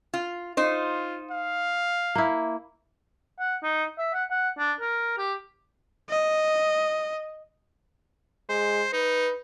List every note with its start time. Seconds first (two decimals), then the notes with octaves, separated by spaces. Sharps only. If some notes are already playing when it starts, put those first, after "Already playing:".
0.14 F4
0.57 D#4 F4 C5
1.31 F5
2.15 A#3 E4
3.40 F#5
3.63 D#4
3.98 E5
4.13 F#5
4.31 F#5
4.58 D4
4.80 A#4
5.18 G4
6.09 D#5
8.49 G#3 C5
8.93 D#4 B4